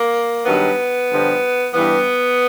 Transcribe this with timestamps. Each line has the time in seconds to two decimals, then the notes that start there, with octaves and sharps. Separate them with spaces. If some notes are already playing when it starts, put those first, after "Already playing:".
Already playing: A#3
0.45 G2 D#3 F#3 B3
1.09 G2 D3 F3
1.74 G2 E3 B3